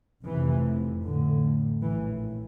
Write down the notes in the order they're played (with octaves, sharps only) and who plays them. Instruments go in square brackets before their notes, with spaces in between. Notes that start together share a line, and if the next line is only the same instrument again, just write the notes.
[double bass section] F1 F2 C3 E3
A1 A2 D3
A#1 A2 E3